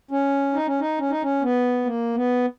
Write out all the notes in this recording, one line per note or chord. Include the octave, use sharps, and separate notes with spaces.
C#4
D#4
C#4
D#4
C#4
D#4
C#4
B3
A#3
B3